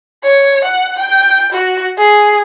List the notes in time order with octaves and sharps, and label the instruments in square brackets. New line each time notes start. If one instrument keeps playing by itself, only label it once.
[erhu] C#5
F#5
G5
F#4
G#4